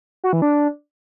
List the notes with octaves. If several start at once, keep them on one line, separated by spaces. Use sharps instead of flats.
F#4
E3
D4